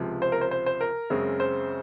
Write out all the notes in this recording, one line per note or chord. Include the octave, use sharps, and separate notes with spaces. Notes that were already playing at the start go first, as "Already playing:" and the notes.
Already playing: C#2 C3 F3
C5
A#4
C5
C5
C5
A#4
F#2 C#3 G#3 C4
C5